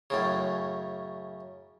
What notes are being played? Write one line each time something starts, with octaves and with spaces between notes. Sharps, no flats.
F#2 A2 C#3